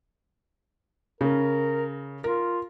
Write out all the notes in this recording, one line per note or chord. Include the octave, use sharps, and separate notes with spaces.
C#3 A#4
F4 A#4